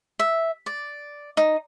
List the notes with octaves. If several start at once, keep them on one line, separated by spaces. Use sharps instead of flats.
E5
D5
D#4